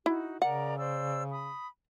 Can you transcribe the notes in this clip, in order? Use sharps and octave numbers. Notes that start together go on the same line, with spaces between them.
D#4 E4 F#4
C#3 A#4 D5 F#5 A#5
C5 D5 E6
B5 D#6